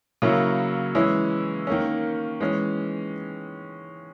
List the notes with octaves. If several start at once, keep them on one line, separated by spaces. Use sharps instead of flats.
C#3 F#3 A#3 C#4 E4
E3 G#3 C#4 E4
D#3 A#3 C#4
E3 G#3 C#4